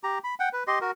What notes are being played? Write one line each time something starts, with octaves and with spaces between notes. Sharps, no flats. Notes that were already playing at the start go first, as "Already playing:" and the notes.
G4 A#5
B5
F#5 G5
B4
G4 D#5 C6
F#4 A#4